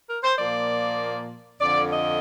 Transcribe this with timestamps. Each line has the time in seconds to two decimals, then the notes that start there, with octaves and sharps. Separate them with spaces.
0.08 A#4
0.23 C5
0.38 A#2 F3 A#3 D5
1.61 F2 D3 F3 D5
1.92 D#5